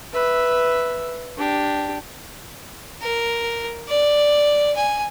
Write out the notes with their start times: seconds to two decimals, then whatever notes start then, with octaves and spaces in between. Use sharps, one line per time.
0.13 B4 E5
1.37 D4 G4
3.02 A#4
3.88 D5
4.76 G#5